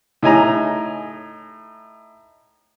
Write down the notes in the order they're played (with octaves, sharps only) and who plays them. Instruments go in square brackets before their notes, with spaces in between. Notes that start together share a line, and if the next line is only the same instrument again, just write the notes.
[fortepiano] A2 D#4 G#5 A#5